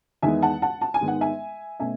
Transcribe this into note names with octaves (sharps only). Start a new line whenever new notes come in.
E2 D#3 G#3 B3 E5 G#5
F#5 A5
F#5 A5
A5
G#5
G#2 D#3 G#3 B3
F#5
E5 G#5
B2 A3 C#4 E5 G#5